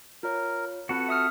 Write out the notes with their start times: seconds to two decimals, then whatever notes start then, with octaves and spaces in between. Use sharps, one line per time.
0.23 F4 A#4 C#5
0.89 C4 F4 F#4 A4 B4
1.09 E5 D#6 F6